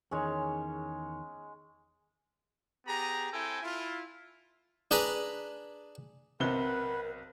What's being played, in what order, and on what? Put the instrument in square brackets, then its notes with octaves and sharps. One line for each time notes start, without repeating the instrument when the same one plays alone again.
[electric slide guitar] E2 D#3 C#5 [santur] G#3 C#4
[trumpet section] B3 G4 G#4 A#5
C4 E4 A4 G5 G#5
E4 F4
[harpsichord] D4 G#4 B4 G#5 A#5 B5
[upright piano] B1 C4 G7 [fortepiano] C3 [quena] A#4 [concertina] B4 F#5